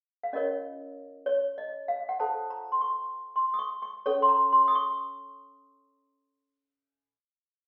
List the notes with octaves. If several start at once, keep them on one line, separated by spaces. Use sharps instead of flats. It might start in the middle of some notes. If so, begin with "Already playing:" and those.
F5
C#4 F4 A#4 C#5 D#5
C#5
D#5
F5
F#5
F4 A4 C5 A5
A#5
C6
C#6
C6
D#6
C#6
C#6
C#4 A4 C#5 C#6
C6
A#5
C6
D#6
C#6